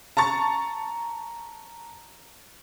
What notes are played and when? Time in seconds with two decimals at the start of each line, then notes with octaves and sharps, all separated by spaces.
0.17 A5 A#5 C#6 A6